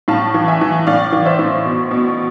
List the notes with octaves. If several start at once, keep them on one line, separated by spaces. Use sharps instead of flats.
A2 F5 A5
E3
E5 G#5
E3
A2 D5 F5
E3
C5 E5
A2
B2
B2